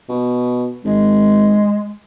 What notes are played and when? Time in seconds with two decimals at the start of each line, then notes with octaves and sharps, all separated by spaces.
0.09 B2
0.85 G#1 G#3